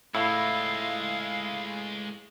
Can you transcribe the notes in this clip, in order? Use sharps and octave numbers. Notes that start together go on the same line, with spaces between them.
A2 G#3 E4 F4 F5